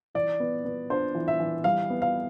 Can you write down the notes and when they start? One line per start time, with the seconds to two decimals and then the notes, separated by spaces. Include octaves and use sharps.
0.15 E3 D5
0.40 B3
0.65 B3
0.90 D4 C5
1.15 E3
1.28 E5
1.40 E3
1.64 G3 F5
1.90 B3
2.02 F5